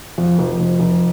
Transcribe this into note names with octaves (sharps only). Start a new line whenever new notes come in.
F2
F1
F1
F1